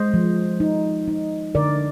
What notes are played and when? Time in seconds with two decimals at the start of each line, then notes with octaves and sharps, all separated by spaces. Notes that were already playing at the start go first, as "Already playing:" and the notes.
Already playing: G#3 C5 D#5
0.14 F3
0.60 D#4
1.08 D#4
1.55 D3 A#4 D5